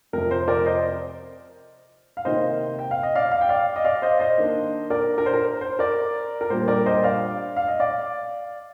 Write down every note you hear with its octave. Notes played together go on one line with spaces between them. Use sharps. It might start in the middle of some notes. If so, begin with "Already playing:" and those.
F2 C3 F3 A#4
C5
A#4 D5
C5 D#5
F5
C3 D#3 A#3 C5 D#5
G5
F5
D#5
D5 F5
F5
G5
D5 F5
D#5
D5 F5
C5 D#5
C5 D#5
D#3 A#3 D4
A#4 D5
A#4
C5
A#4
C5
A#4 D5
A#4
A#2 G3 A#3 D4 C5
A#4 D5
C5 D#5
D5 F5
F5
D#5
D5 F5